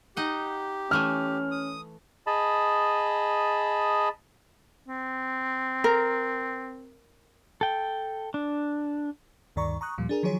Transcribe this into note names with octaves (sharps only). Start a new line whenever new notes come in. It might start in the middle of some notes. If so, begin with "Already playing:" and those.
D#4 G4 D#5 F#5
E3 A3 C#4 G#5 F6
D#6
G#4 D#5 A5 B5
C4
A#4
A4 G5
D4
D2 G2 D#3 D5 A#5 C#6
A#5 C#6 D#6 F#6
D#2 A#2 F3 G3
D4 G#4 A#4
D#3 F3 F#3 G#4 C#5